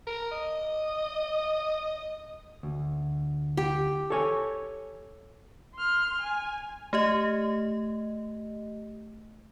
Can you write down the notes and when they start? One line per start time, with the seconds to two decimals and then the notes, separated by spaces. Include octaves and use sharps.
0.07 A#4
0.31 D#5
2.63 D2
3.57 G4
4.10 A4 C#5 G#5
5.75 C6 F6
6.21 G#5
6.93 A3 G4 D#5